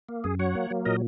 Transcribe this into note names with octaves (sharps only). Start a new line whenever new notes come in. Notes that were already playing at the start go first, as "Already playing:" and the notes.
A#3
F#2 G#4
F#3 C#5 F#5
A#3
F#3
A#2 A#4 D#5